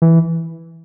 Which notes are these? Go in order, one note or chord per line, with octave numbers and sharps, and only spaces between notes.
E3